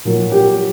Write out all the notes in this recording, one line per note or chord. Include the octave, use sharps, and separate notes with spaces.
A#2 F#3 A#3
G4